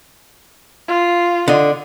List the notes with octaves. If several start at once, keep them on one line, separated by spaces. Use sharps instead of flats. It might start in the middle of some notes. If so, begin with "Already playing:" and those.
F4
D3 D#5